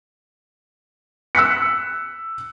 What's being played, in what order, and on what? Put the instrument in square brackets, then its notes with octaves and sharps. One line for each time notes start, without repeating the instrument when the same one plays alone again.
[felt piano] E6 F#6 B6 C#7